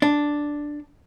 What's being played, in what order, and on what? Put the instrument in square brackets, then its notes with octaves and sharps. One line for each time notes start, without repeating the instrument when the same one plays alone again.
[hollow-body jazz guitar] D4